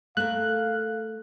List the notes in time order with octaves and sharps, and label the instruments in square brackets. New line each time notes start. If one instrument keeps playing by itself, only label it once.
[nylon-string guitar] A3 A#4 [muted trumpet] F5 [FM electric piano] F#6